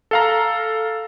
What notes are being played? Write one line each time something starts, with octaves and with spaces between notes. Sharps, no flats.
A4 F5 A#5